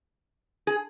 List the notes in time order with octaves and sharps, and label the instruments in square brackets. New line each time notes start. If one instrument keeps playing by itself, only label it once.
[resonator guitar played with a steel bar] G#4